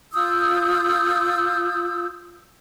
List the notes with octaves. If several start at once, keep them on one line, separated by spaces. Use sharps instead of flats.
F4 D#6 E6 G6